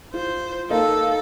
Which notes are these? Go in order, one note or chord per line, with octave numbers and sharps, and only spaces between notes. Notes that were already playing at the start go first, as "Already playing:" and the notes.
F4 C5
A#3 D#4 A4 A#4 F5